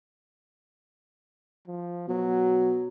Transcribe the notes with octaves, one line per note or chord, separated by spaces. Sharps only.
F3
B2 F#3